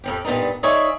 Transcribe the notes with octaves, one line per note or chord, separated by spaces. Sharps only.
F2 F3 G4
G2 A#2 B3 D4 D#4
D#4 F4 G#4 C#5 D5 E5